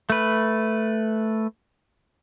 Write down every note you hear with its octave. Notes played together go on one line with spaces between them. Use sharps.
A3 B4